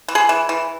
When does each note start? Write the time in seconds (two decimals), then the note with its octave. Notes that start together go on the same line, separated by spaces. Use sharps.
0.08 E3
0.15 G#4
0.29 E3
0.49 E3